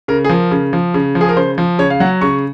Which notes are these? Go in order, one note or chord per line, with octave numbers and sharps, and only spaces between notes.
C#3 A#4
G#4
F3 A#4
C#3
F3
C#3
F3
G#4
A#4
C#3 C5
F3
C#3 C#5
F5
F#3 F#5
C#3 C#6